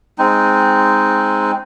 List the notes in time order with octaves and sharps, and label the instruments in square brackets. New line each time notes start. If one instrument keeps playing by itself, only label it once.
[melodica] G#3 C4 D#4